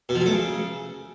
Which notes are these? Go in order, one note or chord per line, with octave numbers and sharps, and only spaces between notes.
B2
F3
F#3
A3
C#3